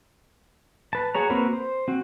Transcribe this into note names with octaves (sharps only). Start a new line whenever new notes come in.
B4 A5
F#4 G#4 C#5 A#5
A#3 C4 F#4 A#4 B4
C5
C4 F#4